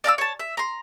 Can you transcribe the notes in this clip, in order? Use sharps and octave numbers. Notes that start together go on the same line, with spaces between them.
D5 F5 A#5 E6
C#5 A5
E5
A#5 C6